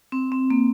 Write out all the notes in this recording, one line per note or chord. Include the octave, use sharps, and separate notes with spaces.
C4
C4
A#3